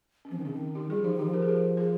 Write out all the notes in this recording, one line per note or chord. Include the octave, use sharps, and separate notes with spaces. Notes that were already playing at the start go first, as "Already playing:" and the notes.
C#4
F3 C4
D#3
C#3 C#4
D#3
D#4 G4
G3 F4 G#4
F3 D#4 G4
D#3
D#4 G4
F3
G4 A#4
G#4
G4 A#4
G#4 C5